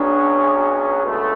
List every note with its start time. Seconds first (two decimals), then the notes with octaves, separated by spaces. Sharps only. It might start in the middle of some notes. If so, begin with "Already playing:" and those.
Already playing: B1 B2 F#3 C#4 D4 G#4
1.02 C#2 B2 A3